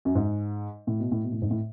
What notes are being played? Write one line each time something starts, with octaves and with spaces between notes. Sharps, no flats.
F#2
G#2
A2
B2
A2
B2
A2
G#2
A2